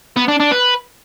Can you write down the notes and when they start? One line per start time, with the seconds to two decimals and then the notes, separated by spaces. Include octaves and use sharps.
0.16 B3
0.28 D4
0.40 D4
0.51 B4